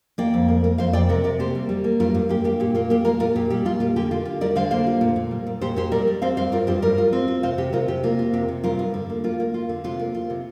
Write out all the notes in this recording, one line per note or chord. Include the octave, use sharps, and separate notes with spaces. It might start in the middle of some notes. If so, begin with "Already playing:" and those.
A#3 D5 G5
F2
A#3
A#3
F2 C5 F5
F2 D5 G5
C3 A#4 D5
C3 A#4 D5
A#3 G4 C5
G3
G3
A#3
G2 F4 A#4
G2
A#3 G4
A#3 G4
A#2 G4
A#3 F4
A#3 G4
A#3 F4 A#4
A#2 F4 A#4
A#2 G4
G3 G4
A#2 F4
A#3 F4
D3 G4
D3 F4
F4
G3 A#4 D5
D3 C5 F5
A#3 C5 F5
F4
A#2
A#2
G3
A#2
A#2 G4 C5
A#2 G4 C5
G3 A#4 D5
G3
C4 C5 F5
G2 C5 F5
F4 A#4 D5
G2 G4 C5
G3 A#4 D5
F4
C4
F4
C3 C5 F5
C3 G4
C3 F4 A#4
C3 G4
A#3 F4
F4
C3 G4
C3
G2 F4 A#4
G2
D3
A#3
A#3 F4
A#3
F4
D3
C3 F4
A#3
F4
C3